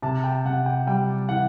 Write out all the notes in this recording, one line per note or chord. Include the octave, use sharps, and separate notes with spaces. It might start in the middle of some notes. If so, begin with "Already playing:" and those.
C3 A5
G5
C3 F#5
G5
G3 G5
E3 F#5